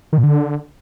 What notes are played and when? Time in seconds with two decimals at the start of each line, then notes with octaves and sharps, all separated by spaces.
0.13 D#3
0.18 A#2
0.23 D3